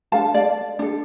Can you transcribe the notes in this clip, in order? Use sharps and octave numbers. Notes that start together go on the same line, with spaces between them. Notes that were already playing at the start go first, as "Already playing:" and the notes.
D4 A4 F5 A5
D5 F5
D4 A4